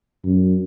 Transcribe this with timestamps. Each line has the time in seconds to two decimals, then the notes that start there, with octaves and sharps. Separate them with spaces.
0.24 F#2